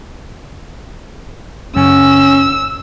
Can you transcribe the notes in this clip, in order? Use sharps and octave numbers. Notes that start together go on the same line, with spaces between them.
F#2 C#3 C#4 G#5 E6